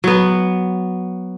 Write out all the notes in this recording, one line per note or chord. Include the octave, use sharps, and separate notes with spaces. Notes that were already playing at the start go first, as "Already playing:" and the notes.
F#3 B3